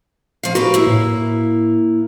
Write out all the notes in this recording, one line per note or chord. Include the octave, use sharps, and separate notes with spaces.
F3 F5
F#4 G4 A#4 B4
A#3 E4
A2